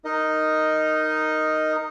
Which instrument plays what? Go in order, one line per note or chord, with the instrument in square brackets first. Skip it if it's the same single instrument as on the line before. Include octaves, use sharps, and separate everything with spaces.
[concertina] D#4 A#4 D#5